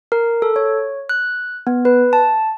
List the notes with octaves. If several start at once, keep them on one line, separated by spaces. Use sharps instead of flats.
A#4
A4
C#5
F#6
B3
B4
A5